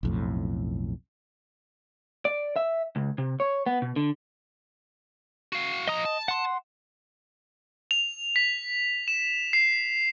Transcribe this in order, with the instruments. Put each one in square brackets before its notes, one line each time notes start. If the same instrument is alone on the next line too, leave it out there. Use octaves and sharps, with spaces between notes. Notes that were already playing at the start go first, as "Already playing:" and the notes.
[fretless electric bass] B1 F2 A2
[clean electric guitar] D5
E5
C#2
C3
C#5
B3
B2
D3
[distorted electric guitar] F#4 F5
[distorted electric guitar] F3 A#5 [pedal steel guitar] D#5 D#6
[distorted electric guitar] A5
[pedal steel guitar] F#5 C6
[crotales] F7
B6
E7
C7